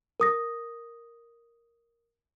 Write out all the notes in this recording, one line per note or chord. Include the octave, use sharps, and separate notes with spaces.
A#4 D#6 A#6